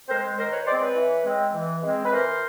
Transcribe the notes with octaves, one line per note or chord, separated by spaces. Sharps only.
G#3 C4 A#4 C5
D#3 A#4 C5
B4 C#5
G#3 C4 C5 D5
B4 C#5
E3
G#3 C4
E3
G#3 C4
B4
E3 A#4 C5